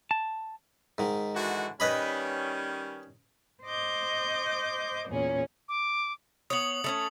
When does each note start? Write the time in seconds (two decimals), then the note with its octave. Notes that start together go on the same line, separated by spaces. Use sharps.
0.11 A5
0.98 G#2 D#3
1.34 D3 E3 F#4
1.80 D#3 G3 C#4 B4 D#5 B5
3.64 C5 D#5 D6 G6
5.09 E2 A#2 C#4 G#4
5.69 D6
6.50 B3 C#5 D#6 F#7
6.84 A3 C4 C#4